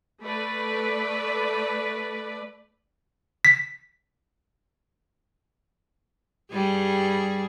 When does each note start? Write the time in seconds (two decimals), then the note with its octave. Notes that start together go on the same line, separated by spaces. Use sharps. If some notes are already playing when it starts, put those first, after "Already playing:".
0.22 A3 B4 D5
3.45 B6
6.52 G2 G3 G#4